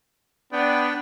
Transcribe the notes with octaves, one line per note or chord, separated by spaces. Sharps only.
B3 D4 D5 G5